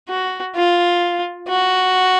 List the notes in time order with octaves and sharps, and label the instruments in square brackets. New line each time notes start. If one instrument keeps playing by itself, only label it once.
[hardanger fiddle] F#4
F4
F#4